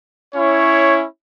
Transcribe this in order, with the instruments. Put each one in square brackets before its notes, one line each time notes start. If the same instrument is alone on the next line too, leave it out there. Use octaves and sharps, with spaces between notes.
[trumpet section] C#4 E4 [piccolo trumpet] C#5